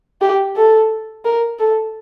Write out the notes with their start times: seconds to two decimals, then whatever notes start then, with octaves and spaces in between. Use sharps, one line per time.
0.21 G4
0.56 A4
1.25 A#4
1.59 A4